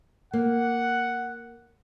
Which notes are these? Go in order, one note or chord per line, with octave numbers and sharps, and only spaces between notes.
A#3 F#5